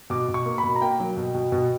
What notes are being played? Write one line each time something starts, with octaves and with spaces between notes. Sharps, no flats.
B2 D6
B2
C#6
A#3
B5
B2
A#5
A#3 G5
F#3
B2
B2
B2